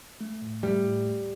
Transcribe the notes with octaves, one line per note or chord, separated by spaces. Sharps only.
A3
A2
G3 A3
A2
D2